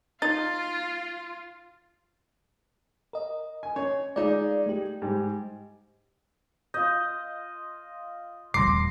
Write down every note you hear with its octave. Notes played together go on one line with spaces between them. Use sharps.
D#4 F4 A6
A#4 D#5
G#5
C#4 C#5
G#3 D#4 F4 D5
A3 G4
G#2 G3
F4 D#5 G6
D#1 E2 A#5 C6 D6 A#6 C7